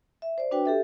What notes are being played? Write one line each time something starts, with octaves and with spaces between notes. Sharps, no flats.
E5
C5 D5
D4 F#4 B4 G5
G4 A4 E5